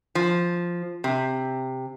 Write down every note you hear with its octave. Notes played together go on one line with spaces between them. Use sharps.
F3
C3